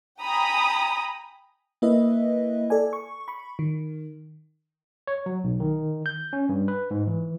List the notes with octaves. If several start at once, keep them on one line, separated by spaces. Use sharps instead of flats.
G5 G#5 A#5 B5 D#6
A#3 E4 B4 D#5 E5
A4 D5 G#5
C#6
B5 C#6
D#3
C#5
F#3
B1
D#3
G6
C#4
G2
B4
G#2
E3